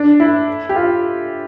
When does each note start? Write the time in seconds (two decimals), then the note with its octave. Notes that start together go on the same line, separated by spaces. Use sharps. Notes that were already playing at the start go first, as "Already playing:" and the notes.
Already playing: D4
0.20 E4
0.69 G4
0.76 F4